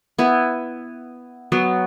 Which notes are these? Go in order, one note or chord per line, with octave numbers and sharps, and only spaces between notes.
B3 E4
F#3 B3